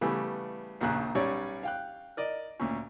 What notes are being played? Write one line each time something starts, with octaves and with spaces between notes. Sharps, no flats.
C#3 E3 G3 A3 B3
A#1 D#2 C#3 F#6
B1 G3 C#4 C#5 D5
F5 G5 F#6
A#4 D5 D#5
D2 A#2 C#4